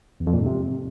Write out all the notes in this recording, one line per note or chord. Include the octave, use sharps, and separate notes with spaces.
E2
F2
A#2
G#2
C3